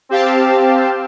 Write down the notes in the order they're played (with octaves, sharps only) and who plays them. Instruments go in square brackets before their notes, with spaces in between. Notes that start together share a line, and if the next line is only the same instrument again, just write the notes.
[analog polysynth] C4 G4 F5 A5